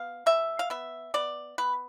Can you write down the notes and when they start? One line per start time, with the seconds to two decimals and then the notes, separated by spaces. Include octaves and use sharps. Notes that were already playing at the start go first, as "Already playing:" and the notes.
Already playing: B3 F5
0.26 B2 E5
0.59 F5
0.70 B3 E5
1.14 B3 D5
1.58 B3 B4